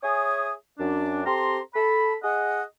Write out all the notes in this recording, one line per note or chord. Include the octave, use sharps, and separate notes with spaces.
G#4 C#5 E5 G#5 D#6
F#2 D4
C4 G4 A4 A#5 C6
A4 B5
G#4 D#5 F#5